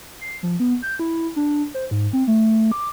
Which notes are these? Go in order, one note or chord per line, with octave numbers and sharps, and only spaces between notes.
C7
F3
B3
G6
E4
D4
C5
G#2
C4
A3
D6